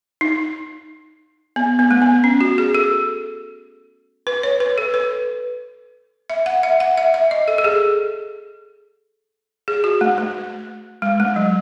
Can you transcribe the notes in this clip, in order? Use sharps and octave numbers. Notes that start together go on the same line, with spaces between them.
D#4
B3
B3
A3
B3
C#4
F#4
G#4
A4
B4
C#5
B4
A4
B4
E5
F#5
E5
F#5
E5
E5
D#5
A4
A4
G#4
G#4
F#4
A3
A3
G#3
A3
F#3